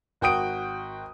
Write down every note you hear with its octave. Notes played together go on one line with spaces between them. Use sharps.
G#1 F#4 G5 D#6 D7